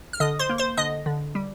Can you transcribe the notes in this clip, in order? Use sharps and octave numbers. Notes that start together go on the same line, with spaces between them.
F6
D3 D#5 D#6
C5 C6
A#3
C5 C6
D3 D#5 D#6
D3
G3